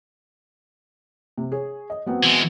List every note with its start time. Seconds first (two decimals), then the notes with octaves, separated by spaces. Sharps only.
1.38 C3
1.52 G#4 C#5
1.90 D#5
2.06 F#3 B3 C4
2.23 E3 G#3